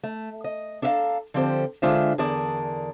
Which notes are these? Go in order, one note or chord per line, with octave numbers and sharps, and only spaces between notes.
A3
D#5
D4 A4 A#4 E5 F5 A#5
D3 F3 C4 G4 A4 C5
D3 G#3 D4 F4 C5 E5
E2 D3 G#4 A#4 D5 A5